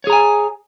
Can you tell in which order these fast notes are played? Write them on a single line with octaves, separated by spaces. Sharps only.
C#5 G#4 A#5 G#5